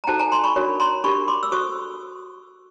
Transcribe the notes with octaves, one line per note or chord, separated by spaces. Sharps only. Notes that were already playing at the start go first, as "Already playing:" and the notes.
A#5
D#4 F#4 A4 C5 G5 A5
G#5 A#5
A#5 C6
B5 C#6
D4 F#4 A#4 C#5
A#5 C6
D4 G4 A#4 B5 C#6
C6 D6
E6
F#4 A4 C5 C#6 D#6